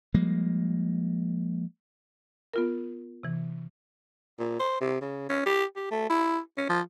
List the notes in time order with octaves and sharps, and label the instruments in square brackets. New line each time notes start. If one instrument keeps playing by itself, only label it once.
[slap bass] F3 G3 G#3 A#3
[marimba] B3 F4 A#4
C3 E3
[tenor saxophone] A#2
C5
C3
C#3
C#4
G4
G4
A3
E4
C#4
F3